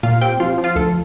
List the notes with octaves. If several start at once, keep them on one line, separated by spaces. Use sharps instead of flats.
A#2 F4 F5
C4 G4 G5
F3 F4 F5
F3
F4 F5
D2 A4